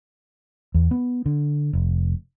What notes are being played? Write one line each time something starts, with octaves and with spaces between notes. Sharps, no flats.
E2
B3
D3
F1